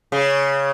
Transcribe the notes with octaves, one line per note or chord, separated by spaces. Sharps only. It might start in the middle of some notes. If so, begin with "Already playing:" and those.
C#3